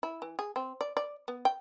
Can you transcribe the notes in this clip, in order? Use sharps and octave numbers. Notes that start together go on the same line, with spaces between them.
E4
E3
G#4
C4
D5
D5
B3
G5